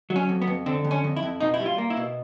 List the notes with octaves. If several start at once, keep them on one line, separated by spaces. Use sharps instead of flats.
F#3
C#4
F2
B3
F2
D3 C4
F2
C#4
F2
E4
F2
B2 D#4
E4
G3
F4
A#3
E4
B2